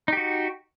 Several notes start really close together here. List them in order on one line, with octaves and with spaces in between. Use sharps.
D#4 G4 F#4